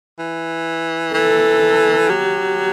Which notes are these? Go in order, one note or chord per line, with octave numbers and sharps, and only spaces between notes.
E3
E3 A4
F#3 G4